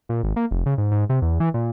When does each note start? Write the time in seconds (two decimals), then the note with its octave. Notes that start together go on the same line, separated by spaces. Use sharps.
0.09 A#2
0.23 G#1
0.36 A#3
0.51 F1
0.66 C#3
0.78 G#2
0.92 G#2
1.09 C3
1.22 E2
1.40 E3
1.54 A#2